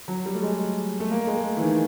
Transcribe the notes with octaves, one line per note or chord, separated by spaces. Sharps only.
F#3
G3
A3
G#3
A3
A#3
G#3
A3
E3
D#3